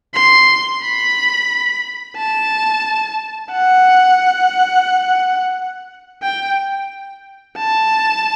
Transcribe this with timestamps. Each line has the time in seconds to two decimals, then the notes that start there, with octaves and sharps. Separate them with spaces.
0.14 C6
0.83 B5
2.17 A5
3.52 F#5
6.23 G5
7.57 A5